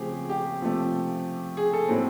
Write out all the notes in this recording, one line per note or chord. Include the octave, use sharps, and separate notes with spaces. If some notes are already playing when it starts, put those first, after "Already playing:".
Already playing: C#3 F3 A3 C4 G4 G#4
G4
C3 F3 A3
G#4
A4
A2 F#3 A3 C4